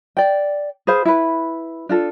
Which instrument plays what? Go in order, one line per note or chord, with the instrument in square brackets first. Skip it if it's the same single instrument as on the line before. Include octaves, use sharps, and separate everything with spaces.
[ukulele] D5 G5
G#4 B4 C5 F5
E4 B4
D4 F4 A4